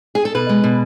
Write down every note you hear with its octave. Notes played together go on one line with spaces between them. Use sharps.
G#4
A4
B2 B4
G#3
B2